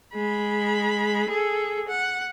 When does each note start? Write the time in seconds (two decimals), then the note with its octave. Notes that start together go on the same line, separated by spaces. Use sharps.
0.14 G#3 B5
1.28 G#4 A4
1.88 F#5